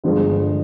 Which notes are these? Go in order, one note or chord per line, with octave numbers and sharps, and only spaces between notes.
G1 G2 F3 G#3